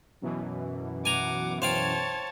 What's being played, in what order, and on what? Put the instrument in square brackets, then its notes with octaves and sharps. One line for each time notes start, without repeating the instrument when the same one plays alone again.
[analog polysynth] F#2 B2 E3
[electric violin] F#5 D6 [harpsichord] G#5 A#5
[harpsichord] C5 F5 G5 [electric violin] C#5 A5